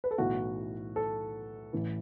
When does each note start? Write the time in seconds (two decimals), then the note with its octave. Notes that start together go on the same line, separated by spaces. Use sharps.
0.04 B4
0.11 A4
0.18 B1 A2 E3 F#4
0.96 A4
1.73 A1 A2 E3